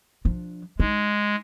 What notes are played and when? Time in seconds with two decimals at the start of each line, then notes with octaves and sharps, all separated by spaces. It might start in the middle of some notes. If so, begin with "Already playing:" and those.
0.25 F3 D4
0.80 G#3 D#4